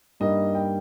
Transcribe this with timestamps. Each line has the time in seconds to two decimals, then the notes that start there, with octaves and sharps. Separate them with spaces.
0.20 G2 G3 A#3 D#4 D#5
0.55 G5